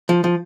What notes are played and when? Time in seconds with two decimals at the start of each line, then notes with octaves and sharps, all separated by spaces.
0.09 F3
0.24 F3